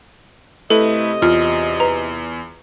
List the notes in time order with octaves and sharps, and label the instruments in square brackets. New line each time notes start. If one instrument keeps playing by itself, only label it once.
[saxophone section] C3 D#5 [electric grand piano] A3 E4 B4 [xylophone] A4
[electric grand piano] E2 [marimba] F4
[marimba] B4 [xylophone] A#5